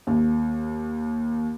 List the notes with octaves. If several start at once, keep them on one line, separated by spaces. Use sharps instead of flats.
D#2